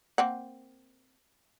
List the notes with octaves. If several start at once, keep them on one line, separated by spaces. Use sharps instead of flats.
A#3 C4 F#5